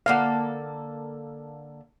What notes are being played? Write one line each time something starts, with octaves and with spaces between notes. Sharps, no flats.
D3 A#3 A4 F5 F#5